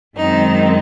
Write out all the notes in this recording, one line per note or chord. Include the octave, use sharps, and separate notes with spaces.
F#2 D#3 G#3 C4 D#4